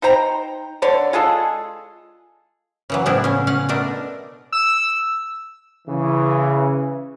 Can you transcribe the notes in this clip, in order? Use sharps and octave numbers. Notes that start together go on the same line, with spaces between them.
D#4 C5 G5 A#5
D3 C#5 D5
G#3 F4 G#4 A4
C#3 E3 F#3
A2 F3 B3 D4 E4
C#3 C#4
C#4 F5 F#5
B2 A3 D4 A#4
E6
C#3 E3